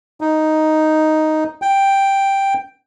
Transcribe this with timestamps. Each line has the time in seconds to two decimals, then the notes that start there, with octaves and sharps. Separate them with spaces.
0.21 D#4
1.62 G5